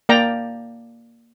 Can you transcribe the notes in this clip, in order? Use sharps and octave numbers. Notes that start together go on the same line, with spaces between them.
A#3 D5 G5 A#5